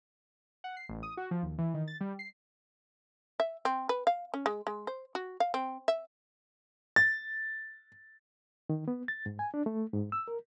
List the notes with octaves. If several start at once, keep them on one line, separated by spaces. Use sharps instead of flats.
F#5
C7
A1
D#6
F#4
F3
D#2
E3
D#3
A6
G3
C7
E5
C4
B4
F5
C#4
G#3
G#3
C5
F#4
F5
C4
E5
A6
D#3
B3
A6
G#2
G#5
D4
A3
G#2
E6
A#4